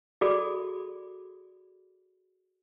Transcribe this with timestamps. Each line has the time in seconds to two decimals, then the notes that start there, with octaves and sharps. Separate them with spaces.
0.21 F#4 G#4 A4 D5 B5 D6